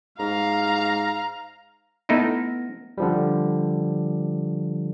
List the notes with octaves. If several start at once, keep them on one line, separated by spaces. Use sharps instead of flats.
G#2 F5 A#5
A3 B3 D#4 E4 A#6
D3 F3 G3